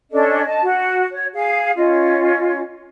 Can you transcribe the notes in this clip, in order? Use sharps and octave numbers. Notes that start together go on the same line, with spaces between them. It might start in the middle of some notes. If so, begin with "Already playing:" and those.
C#4 D4 A4 D#5
D#5 A5
F#4
C#5
G#4 F5
C#4 F4 D#5